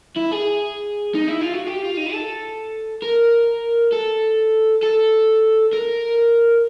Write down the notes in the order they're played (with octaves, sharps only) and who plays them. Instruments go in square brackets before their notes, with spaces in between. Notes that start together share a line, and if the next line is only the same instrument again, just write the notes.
[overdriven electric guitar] E4
G#4
D#4
E4
F4
F#4
G4
F4
D#4
A4
A#4
A4
A4
A#4